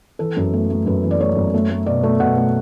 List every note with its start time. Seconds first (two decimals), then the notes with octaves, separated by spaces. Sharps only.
0.19 E3 A4
0.37 F#2
0.53 A3
0.70 A3
0.86 F#2 B4
1.04 E3
1.11 D5
1.19 A3 C#5
1.36 F#2
1.54 A3
1.70 A3
1.86 B2 D5
2.03 A3
2.20 B2 F#5
2.37 A3